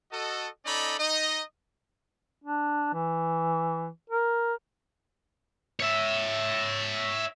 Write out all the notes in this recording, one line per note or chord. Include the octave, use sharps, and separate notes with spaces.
F#4 A4 D#5
C#4 D#4 A4 D5 D#5 B5
D#4 D#5
D4
E3
A#4
C#5 E5